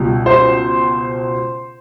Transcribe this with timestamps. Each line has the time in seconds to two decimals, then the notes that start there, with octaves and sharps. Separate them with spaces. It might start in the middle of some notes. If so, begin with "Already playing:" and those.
Already playing: C#2 B2 G3
0.26 C5